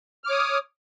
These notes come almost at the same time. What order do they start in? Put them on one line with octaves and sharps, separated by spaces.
F6 D6 C#5 D#6